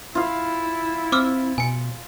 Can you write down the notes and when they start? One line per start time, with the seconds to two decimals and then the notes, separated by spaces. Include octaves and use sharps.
0.15 E4 F4 F5
1.12 C4 D6 E6 F6
1.58 B2 G#5 C#7